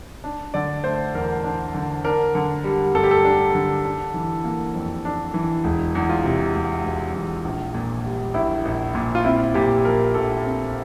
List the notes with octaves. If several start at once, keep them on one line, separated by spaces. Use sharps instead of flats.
D4
D3 D5
A3 C5
E2 A#4
D4
D3
D4 A#4
D3
G3
G2 A4
G4
A4
D4
D3
D4
E3
A#3
F2
D4
E3
E1
E2
F4
C3
E1
E1
E2
A#1
A#2
G3
A#1 E4
A#1
A#2
F4
C4 E4
A#2 G4
F3 A#4
A#1 A4
C4